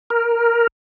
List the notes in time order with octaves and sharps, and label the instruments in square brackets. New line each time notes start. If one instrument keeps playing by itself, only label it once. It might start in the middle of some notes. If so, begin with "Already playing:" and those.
[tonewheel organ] A#4